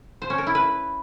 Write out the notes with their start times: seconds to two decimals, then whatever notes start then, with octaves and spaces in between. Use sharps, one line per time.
0.22 C5
0.30 C#4
0.38 A#4
0.47 E4
0.55 B4